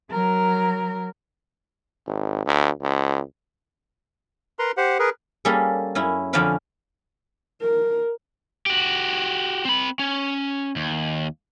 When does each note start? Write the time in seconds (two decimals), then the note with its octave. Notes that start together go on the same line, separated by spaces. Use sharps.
0.11 F#3 A#4
2.07 G#1
2.46 D2
2.82 C#2
4.59 A#4 B4 A#5 C6
4.77 G4 C5 F#5
4.99 G#4 A#4 B4
5.45 G3 A#3 C#4 G#4 A4
5.95 F#2 C#4 E4
6.33 F2 D3 C#4 D5 F5 B5
7.61 A#4
8.66 F#4 G4
9.65 C4 B5
9.99 C#4
10.76 D#2